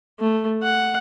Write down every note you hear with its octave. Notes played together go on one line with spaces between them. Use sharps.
A3
F#5